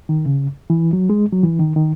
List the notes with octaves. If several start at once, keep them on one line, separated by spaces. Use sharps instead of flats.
D#3
C#3
E3
F#3
G#3
F#3
E3
D#3
D#3